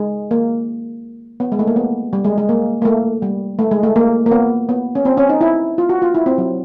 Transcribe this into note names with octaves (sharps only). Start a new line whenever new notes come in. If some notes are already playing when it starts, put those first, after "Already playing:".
Already playing: G#3
A#3
B3
G#3
A3
A#3
B3
G3
G#3
G#3
A#3
A#3
A3
G3
A3
G#3
A3
A#3
A#3
B3
B3
C#4
C4
C#4
D#4
E4
F4
F#4
F4
E4
C4
F#3